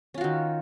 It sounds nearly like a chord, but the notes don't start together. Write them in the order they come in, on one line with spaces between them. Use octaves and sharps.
C#4 F4 F#4 D#3